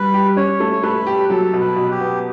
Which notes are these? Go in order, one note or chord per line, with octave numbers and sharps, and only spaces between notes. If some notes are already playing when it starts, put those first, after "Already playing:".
Already playing: G3 B4
G4
C#4 C#5
A3
C#5
A3 B4
G4
F#3 A4
B2
B4
B2
G4
B3